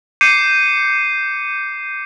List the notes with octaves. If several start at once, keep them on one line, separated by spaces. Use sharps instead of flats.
D6 G6 C7 C#7 D#7